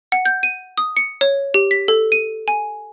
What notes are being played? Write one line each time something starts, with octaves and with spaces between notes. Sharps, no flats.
F#5
G6
D#7
D#6
C#7
C#5
G4
B6
A4
D#7
G#5